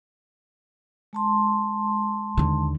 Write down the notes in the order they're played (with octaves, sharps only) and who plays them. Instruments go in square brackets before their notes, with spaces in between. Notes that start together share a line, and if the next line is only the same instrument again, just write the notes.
[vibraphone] G#3 A5 C6
[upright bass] D#2 D3